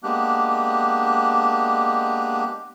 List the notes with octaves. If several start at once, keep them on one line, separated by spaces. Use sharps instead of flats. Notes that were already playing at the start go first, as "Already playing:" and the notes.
G#3 A#3 B3 D4 G4 F#6